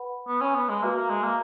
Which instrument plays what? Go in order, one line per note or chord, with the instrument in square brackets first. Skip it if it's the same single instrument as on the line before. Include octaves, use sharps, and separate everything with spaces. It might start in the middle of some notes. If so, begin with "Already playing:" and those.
Already playing: [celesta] B4 F#5 B5
[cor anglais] B3
C#4
B3
G#3
[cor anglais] A#3 [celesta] F#4 B4 E5 A#5
[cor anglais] A#3
G#3
A#3